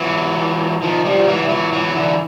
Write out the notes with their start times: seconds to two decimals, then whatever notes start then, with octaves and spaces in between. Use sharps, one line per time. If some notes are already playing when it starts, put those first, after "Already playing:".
Already playing: E3 F#3
0.82 D#3 F3
1.05 F3 G3
1.27 E3 F#3
1.42 G3
1.49 E3 F#3
1.73 E3 F#3
1.94 D3 E3